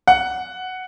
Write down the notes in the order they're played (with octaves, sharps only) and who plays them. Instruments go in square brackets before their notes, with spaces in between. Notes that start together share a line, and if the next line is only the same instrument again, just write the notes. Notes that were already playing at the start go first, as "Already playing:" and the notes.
[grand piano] F#5